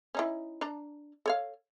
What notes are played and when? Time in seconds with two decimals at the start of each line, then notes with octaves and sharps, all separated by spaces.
0.15 C#4 D#4 E4
0.61 D4 A5 A#5
1.26 A4 C#5 F5